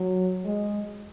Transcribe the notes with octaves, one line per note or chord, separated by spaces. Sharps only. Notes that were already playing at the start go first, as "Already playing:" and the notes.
Already playing: F#3
G#3